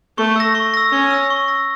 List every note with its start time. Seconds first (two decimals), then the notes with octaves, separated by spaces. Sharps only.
0.18 A3 C#6
0.36 E6 A#6
0.55 C#6
0.74 E6 A#6
0.92 C#4 C#6
1.11 E6 A#6
1.30 C#6
1.48 E6 A#6